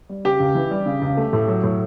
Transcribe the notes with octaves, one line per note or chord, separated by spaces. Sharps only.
G3
C#3 G4
C#2
E3
G3
C#3
C#2
A3
A2
F#3
A2